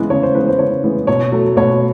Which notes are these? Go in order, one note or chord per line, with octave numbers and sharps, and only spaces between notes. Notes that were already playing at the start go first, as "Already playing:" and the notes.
Already playing: C#3 E3 G#3 B3
C#3 C#5
C5
E3 G#3 B3 B4
C5
C#3 C#5
E3 G#3 B3
B2 C#5
F#3 A3
B2 C#5